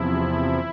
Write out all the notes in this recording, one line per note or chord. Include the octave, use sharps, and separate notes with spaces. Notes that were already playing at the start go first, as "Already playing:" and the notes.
Already playing: E2 C3 F3 E4